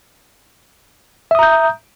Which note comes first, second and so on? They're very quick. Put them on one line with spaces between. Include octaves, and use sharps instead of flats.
E5 D#6 A#5 G6